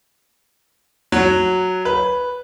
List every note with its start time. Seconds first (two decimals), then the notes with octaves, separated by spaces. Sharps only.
1.12 F#3
1.85 B4